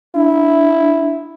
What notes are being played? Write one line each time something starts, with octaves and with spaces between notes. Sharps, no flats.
D4 E4